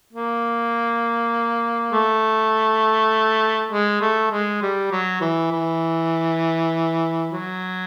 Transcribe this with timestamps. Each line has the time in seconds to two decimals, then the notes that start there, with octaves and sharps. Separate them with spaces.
0.13 A#3
1.92 A3
3.71 G#3
4.01 A3
4.32 G#3
4.62 G3
4.91 F#3
5.21 E3
5.52 E3
7.31 F#3